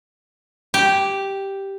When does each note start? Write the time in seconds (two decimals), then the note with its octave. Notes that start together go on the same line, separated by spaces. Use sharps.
0.74 G4